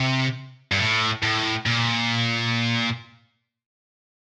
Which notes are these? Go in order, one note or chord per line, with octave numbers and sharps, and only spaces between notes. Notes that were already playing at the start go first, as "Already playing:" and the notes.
Already playing: C3
G2
A2
A2
A#2